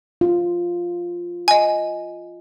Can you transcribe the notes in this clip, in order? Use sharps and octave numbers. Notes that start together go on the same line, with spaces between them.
F4
D#5 G#5